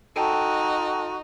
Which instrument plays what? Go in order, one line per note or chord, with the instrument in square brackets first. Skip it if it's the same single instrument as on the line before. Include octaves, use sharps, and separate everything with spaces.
[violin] D#4 [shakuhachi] F#4 [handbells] A4 G5 A5